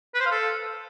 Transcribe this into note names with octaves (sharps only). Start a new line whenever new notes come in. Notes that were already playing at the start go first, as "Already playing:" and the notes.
B4
C5
F5
A4